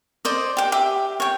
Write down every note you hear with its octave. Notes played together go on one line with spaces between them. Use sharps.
C5 D5 D#5
G4 G5
G4 E5
C#5 G5